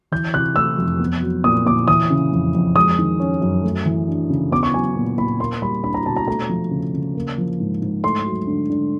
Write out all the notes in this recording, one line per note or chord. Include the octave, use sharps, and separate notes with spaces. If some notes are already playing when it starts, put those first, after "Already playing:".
E3 G6
C3 F#6
A3 E6
F2
B3
F#3
A#2 D#6
A#2 D6
E3 D#6
C#3
F2
F2
G#3 D#6
D#3
C#4
F#2
A3
E3
D4
C#3
B3 D6
C#6
F#3 G#5
A#2
A#2 B5
A#3 C6
G3 B5
D4 B5
A#5
B2 A5
A#5
A3 A#5
F3
C#3
C#3
A#3
F3
G#2
G#2
A3 C6
F#3
D3
D3